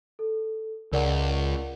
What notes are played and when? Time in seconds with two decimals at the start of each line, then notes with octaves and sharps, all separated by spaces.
0.19 A4
0.92 C#2 A#4 D5 F#5